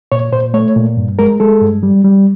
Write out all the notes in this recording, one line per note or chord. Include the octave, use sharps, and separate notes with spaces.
A#2 C#5
A#2 C5
A3 C#5
A#2
G2
G#3 A#4
G#3 A4
G2
G3
G3